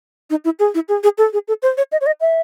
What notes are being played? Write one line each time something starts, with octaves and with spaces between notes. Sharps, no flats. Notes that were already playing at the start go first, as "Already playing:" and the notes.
D#4
E4
G#4
E4
G#4
G#4
A4
G#4
A4
C5
C#5
D#5
C#5
D#5
E5